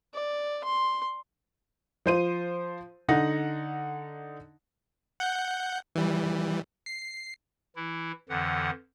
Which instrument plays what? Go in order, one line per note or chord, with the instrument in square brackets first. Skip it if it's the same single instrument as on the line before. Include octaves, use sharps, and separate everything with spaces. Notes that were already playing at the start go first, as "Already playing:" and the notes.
[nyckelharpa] D5
C6
[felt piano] F3 C5 D#7
D3 D#4 F#5 A#6
[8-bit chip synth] F#5 G6
E3 G3
C7
[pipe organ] E3 E4
F2 D3 E3 F#5